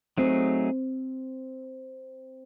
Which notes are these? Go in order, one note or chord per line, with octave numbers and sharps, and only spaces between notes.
F#3 A3 C4 D#4 G#4